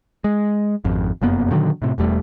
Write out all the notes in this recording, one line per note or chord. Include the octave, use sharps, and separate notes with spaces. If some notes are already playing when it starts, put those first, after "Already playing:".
G#3
G#1 F2
F1 F#2 A#3 B3
A#2 D3 D#3 F#3
A2 C3
E1 E2 G3 A3